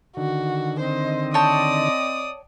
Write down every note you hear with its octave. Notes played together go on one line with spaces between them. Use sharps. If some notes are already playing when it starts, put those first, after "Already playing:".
D3 D#3 F#4
C4 C5 D#5
C#5 D5 G5 A5 D#6